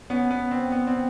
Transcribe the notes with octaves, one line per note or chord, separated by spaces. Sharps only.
B3 C#4
B3
C4
B3
C4